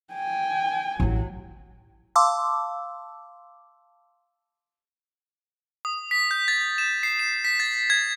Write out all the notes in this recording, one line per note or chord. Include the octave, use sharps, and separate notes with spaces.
G5 G#5
A1 E3 F#3
F5 A5 C6 D6 E6
D#6
B6
G6
A6
E7
C7
E7
B6
A6
G#6